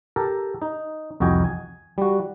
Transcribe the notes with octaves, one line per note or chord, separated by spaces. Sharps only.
G4 A4 A#4
D#4
C2 F2 F#4 D#5 G5 G#5
G#5
G3 F#4